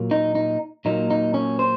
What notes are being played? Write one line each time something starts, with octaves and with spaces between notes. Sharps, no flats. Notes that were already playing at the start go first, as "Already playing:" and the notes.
Already playing: A#2 F#3 A#3
D#4
D#4
A#2 F#3 A#3 D#4
D#4
C#4
C5